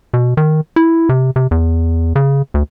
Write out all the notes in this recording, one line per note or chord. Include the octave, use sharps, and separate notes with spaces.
B2
D#3
E4
C3
C3
E2
C#3
D2